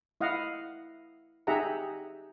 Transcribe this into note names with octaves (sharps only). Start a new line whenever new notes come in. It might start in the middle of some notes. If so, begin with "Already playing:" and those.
E4 D#5 F5 F#5
D#4 G4 G#4 E5 F#5 A#5